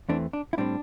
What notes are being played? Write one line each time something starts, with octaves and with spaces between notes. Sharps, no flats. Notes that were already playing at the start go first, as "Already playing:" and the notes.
E2 E3 A3 C4 D4
D4
E4
A2 G3 C4 D4